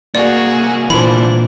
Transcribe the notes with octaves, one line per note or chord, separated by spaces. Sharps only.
C2 A#3 F#4 G#4 D5
A#2 E3 D4 C5 B5